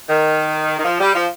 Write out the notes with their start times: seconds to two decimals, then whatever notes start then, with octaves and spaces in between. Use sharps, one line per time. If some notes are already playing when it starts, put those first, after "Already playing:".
0.09 D#3
0.79 D#3
0.85 F3
1.00 G3
1.15 F3